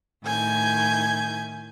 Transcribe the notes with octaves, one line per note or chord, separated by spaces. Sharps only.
A2 D#3 E4 G#5 G6 G#6